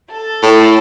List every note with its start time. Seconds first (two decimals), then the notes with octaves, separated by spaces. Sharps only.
0.12 A4 A5
0.42 A2